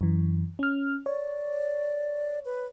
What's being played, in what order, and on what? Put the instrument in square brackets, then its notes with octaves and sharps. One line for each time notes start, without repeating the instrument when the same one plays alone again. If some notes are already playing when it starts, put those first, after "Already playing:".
[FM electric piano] F#2 E3
C#4 F6
[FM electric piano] C#5 [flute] D5
[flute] B4